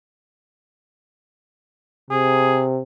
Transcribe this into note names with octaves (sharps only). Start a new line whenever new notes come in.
C3 G#4